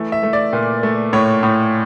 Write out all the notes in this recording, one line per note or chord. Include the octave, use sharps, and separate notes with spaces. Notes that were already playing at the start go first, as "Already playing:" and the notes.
Already playing: E3 A3
E5
A3
D5
A#2
A3
A2 C#5
A2